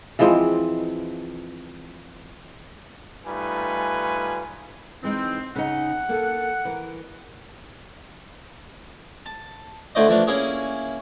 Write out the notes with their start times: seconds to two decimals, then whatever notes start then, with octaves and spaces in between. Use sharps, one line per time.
0.19 E3 F3 G#3 C4
3.27 G3 A3 D#4 F4 B4 G#5
5.03 E3 G#3 C4 D#4
5.56 C#3 D#4 F#5
6.09 A#3 A4
6.65 E3 A#4
9.26 A5
9.95 D3 A3 E4 C5 D5 D#5
10.08 E3 F3 A3 D4
10.27 A#3 C#4 E4 G#4